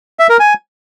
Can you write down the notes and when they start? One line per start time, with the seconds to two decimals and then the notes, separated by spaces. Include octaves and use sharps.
0.19 E5
0.30 A#4
0.40 G#5